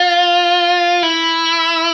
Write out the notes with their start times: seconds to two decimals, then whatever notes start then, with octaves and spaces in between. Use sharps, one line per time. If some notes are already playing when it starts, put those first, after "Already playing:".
Already playing: F4
1.03 E4